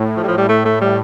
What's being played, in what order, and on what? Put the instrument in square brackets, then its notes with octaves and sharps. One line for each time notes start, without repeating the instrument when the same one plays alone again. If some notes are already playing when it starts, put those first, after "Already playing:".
Already playing: [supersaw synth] A2
[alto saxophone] F3
G3
F3
G3
A3
A3
G3